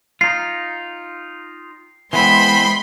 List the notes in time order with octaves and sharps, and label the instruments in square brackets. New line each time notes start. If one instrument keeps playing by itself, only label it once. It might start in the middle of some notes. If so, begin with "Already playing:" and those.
[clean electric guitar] D#4 F4 [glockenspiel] C7
[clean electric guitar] E3 B3 C4 [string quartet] G#3 B5 C6